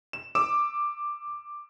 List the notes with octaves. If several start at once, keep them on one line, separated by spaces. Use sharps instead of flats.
E7
D6 E6 E7